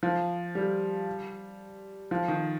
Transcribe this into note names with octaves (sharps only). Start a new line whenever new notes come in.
F3
G3
F3
D#3